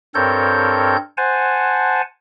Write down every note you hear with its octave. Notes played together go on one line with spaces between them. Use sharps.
G2 C4 A4 A#4 C#5 G6
C5 F#5 G#5 A5